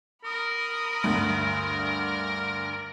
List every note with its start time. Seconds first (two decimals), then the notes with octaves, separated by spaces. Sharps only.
0.24 A#4 B5 D#6
1.03 D2 G2 D3
1.79 D5